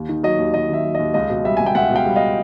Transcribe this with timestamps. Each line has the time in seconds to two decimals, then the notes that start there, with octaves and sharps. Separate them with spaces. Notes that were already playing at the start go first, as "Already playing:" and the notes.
Already playing: D#2
0.09 D#3
0.23 F#3 D#5
0.39 D#2
0.54 D#2 D#5
0.69 D#3 E5
0.84 F#3
0.95 D#5
0.99 D#2
1.14 C#2 D#5
1.30 B2
1.44 G3 E5
1.57 C#2 G#5
1.66 G5
1.75 C#2 E5 F#5
1.90 B2
1.96 F5 G5
2.06 G3
2.16 D#5 F5